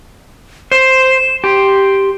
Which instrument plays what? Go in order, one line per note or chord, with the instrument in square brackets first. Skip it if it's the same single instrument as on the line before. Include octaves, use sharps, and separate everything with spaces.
[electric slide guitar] C5 [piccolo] E7
[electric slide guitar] G4 [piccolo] C6